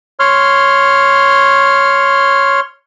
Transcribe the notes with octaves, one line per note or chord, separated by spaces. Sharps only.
C#5 C6 F6